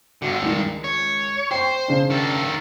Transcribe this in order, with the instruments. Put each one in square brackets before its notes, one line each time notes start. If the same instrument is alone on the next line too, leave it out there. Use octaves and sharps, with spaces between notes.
[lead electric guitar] G2 D3 [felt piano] F#4
[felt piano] C#2 D#3
[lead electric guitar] C#5
[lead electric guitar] C5 [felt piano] G5 C#6
[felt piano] C#3 D4
[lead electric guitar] D#3 A4